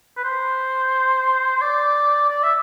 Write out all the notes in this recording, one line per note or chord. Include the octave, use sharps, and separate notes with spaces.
B4
C5
D5
D5
E5